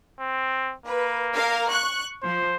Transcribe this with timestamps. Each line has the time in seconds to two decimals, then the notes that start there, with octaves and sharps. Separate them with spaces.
0.19 C4
0.86 A#3 B4
1.34 A#4 F5
1.70 C#6 F#6
2.23 F3 C5